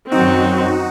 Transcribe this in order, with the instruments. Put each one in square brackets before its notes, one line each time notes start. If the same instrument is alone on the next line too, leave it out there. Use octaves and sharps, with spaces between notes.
[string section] F#2 D#3 F#3 C4 [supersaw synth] D#4 F#4